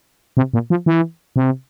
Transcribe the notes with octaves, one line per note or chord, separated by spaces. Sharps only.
C3
A#2
F3
E3
C3